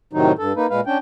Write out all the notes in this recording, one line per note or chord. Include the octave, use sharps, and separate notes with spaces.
A2 C3 D#3 F#3 D#4
G2 A4
A#3 D#4 B4
A#2 G#3 B4 F5
C#4 D4 G5